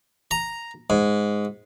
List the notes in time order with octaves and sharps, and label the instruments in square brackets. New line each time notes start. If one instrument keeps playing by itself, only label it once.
[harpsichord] A#5
G#2